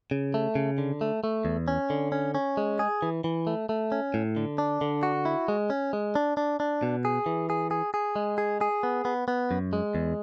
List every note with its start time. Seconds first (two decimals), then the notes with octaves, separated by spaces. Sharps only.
0.11 C#3
0.34 A3
0.55 C#3
0.78 D3
1.01 A3
1.24 A3
1.45 E2
1.68 C#4
1.90 D3
2.12 C#4
2.35 C#4
2.57 G#3
2.79 G#4
3.02 E3
3.24 E3
3.47 A3
3.69 A3
3.92 C#4
4.14 A2
4.36 D3
4.58 D4
4.81 D3
5.03 F#4
5.25 E4
5.48 G#3
5.70 C#4
5.93 G#3
6.15 D4
6.37 D4
6.60 D4
6.83 B2
7.05 G#4
7.26 E3
7.50 G#4
7.71 G#4
7.94 G#4
8.16 G#3
8.38 G#4
8.61 G#4
8.83 B3
9.05 B3
9.28 B3
9.51 F#2
9.73 G#3
9.95 E2